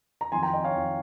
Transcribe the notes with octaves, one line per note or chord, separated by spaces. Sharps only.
A#5
F2 D#3 G#5 C6
G5 A#5
D#5 G5
C#5 F5
F2 D#3